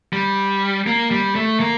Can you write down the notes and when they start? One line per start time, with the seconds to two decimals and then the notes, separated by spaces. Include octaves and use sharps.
0.13 G3
0.87 A#3
1.11 G3
1.35 A3
1.60 A#3